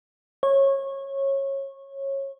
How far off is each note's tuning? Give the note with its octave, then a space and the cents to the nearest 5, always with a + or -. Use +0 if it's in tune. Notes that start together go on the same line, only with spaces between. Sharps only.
C#5 -20